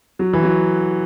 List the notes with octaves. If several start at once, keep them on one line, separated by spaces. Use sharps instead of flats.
F#3
E3
F#3